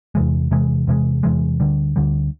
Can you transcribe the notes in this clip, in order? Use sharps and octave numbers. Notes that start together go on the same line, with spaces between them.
E2 C3 E3 G#3
E2 C3 E3 G#3
E2 C3 E3 G#3
E2 C3 E3 G#3
D2 D3 G3
D2 D3 G3